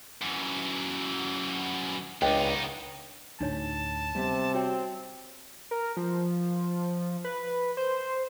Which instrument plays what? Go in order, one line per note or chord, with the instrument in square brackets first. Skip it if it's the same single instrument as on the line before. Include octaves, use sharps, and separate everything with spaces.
[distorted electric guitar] F#2 E3
[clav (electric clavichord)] C#2 D4 [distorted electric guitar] B3 D#4 [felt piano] G5
[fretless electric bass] D2 A2 [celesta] D4 D#4 C#5 [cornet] A5
[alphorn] C3 [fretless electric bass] G3 B3
[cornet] C4 [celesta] F#4 C#5 G5
[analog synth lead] A#4
F3
B4
C5